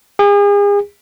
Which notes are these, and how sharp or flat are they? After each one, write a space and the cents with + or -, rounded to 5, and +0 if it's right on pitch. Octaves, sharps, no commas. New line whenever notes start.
G#4 -40